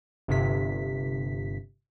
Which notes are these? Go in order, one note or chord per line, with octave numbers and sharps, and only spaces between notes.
G1 G2 C3 B6